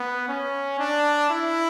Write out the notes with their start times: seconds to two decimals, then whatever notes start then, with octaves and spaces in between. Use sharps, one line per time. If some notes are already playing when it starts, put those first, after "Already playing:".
Already playing: B3
0.28 C#4
0.79 D4
1.30 E4